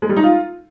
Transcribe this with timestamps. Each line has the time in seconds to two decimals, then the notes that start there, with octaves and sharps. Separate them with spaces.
0.02 G#3
0.09 G3
0.16 D#4
0.24 F4